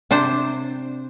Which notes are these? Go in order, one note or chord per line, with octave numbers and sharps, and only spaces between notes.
C3 D4 C5